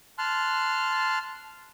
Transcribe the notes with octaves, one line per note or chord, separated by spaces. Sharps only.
A5 C6 F6 F#6